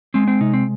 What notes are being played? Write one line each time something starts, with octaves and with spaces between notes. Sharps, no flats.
G#3 C4
C4
C3 D#4
C4